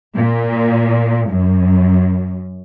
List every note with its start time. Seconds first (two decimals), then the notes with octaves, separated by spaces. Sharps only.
0.15 A#2
1.30 F#2